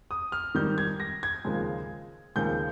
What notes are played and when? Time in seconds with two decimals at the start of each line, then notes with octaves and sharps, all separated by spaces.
0.11 D#6
0.32 F6
0.55 G#2 D#3 G3 G6
0.78 G#6
1.00 A#6
1.23 G#6
1.45 D#2 C#3 F3 G#3
2.35 D#2 C#3 F3 G#3 G6